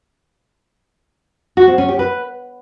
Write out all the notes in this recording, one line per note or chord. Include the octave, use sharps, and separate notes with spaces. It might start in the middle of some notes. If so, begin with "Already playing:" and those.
F#4
C4
C#4
G4
B4